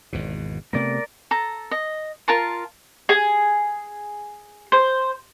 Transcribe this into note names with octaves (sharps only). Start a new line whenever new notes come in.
G#1 E2 B2
C3 A3 B3 A#4 D5
A4 A#5
D#5
F4 A#4 A5 C6
G#4
C5